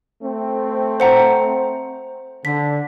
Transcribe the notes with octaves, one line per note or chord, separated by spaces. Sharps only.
A3 C4
C5 F#5 A#5
D3 B6